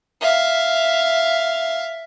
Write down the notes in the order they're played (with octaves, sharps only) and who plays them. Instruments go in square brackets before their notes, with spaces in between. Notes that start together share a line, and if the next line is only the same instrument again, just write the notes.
[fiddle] E5 F5